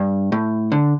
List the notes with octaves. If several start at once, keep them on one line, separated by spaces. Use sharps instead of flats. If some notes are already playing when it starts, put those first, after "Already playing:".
Already playing: G2
A2
D3